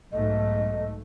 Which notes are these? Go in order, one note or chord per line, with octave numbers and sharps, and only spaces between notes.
B1 G#2 A3 D#5